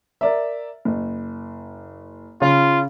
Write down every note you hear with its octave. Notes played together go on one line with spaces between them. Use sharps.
A#4 D5 E5
F#1
C#3 F4